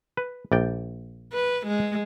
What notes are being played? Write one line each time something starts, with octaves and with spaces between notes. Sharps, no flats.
B4
A#1 D5 G5
B4
G#3